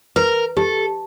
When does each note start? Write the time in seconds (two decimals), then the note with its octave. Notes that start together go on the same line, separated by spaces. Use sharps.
0.16 A#4 B4
0.57 G4 A4